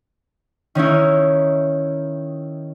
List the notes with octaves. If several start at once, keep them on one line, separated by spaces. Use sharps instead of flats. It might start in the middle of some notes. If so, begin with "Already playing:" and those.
D#3 C#4 D#4 E4